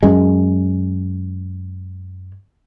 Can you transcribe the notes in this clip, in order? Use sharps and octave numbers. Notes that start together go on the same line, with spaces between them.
F#2 G#3